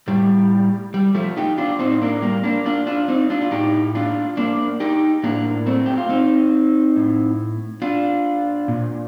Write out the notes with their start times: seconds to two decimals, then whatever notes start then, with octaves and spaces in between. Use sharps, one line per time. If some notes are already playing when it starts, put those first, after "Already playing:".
0.08 A2 G3
0.94 G3
1.15 F3 A3
1.37 D#4 G4
1.58 D4 F4
1.79 A2 C4 D#4
2.02 A#3 D4
2.22 G3 A#3
2.44 A#3 D4
2.66 D4 F4
2.87 D4 F4
3.08 C4 D#4
3.30 D4 F4
3.41 F4
3.51 A2 D#4 G4
3.95 D4 F4
4.37 A#3 D4
4.80 D#4 G4
5.24 A2 A#3 D4
5.66 A3 C4
5.86 G4
5.98 F4
6.09 C4 D#4
6.96 A2
7.82 D4 F4
8.68 A#2